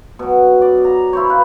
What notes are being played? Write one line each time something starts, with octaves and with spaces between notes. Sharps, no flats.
B2 F#3
D5
A#5
E4 C5 C#5
B4 D#5 F5